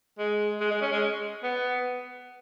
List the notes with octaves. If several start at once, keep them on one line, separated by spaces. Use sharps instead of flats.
G#3
G#3
G#3
C#4
G#3
B3